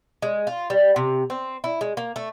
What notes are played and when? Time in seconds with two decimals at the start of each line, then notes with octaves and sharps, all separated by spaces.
0.22 G#3
0.47 F4
0.70 G3
0.96 C3
1.30 C4
1.64 E4
1.81 G#3
1.97 A#3
2.16 A3